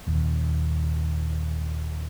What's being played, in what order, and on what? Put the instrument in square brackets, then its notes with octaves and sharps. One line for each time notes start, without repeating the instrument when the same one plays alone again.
[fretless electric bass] D#1 D#2